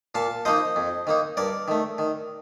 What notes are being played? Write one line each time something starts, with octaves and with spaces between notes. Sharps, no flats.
A#2 F5 A5
F3 A#3 D#4 C5 D#5
F2
D#3 A#3 D#4
G2 A#4 D5
D#3 A3
D#3